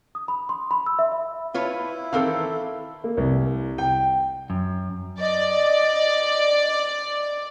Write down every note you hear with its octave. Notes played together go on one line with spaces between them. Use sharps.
D#6
B5
C6
B5
E6
E5
E5
E4 F4 B4 C#5
D#3 E3 C4 A4 A#4 F5
A#3
C2
G5
F#2
D5 D#5